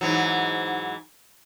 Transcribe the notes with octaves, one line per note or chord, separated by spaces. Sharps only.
G#2 E3 F#3